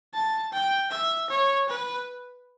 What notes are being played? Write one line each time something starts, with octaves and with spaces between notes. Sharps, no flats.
A5
G5
E5
C#5
B4